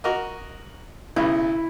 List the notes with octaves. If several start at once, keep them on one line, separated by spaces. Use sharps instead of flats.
F#4 A#4 D#5
B1 C#3 B3 E4